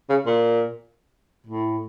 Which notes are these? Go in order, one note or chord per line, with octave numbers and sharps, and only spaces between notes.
C#3
A#2
A2